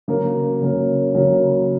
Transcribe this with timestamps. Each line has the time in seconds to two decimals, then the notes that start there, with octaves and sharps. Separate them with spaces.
0.08 C#3 F#3 A#3 C#4 A#4
0.61 C#3 F#3 A#3 C#4 A#4
1.15 C#3 F#3 A#3 C#4 A#4